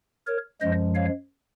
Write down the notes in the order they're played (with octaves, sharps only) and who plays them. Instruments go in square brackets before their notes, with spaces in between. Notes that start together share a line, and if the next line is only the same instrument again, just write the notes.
[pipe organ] A#4 C#5
F#2 F3 G#3 C5 D#5
C#5 F5